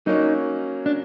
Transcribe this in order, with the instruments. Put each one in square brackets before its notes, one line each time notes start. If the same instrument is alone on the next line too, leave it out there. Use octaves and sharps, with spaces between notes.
[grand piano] F#3 A#3 C#4 [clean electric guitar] D#4
[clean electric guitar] D4